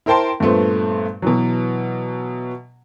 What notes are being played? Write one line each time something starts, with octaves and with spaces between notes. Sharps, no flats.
E4 A#4 C5 G5 A5 C6
G2 A#2 A3 B3 C5
B2 E3 F#3